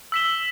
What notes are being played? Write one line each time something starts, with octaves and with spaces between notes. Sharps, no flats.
E6 B6 E7 G7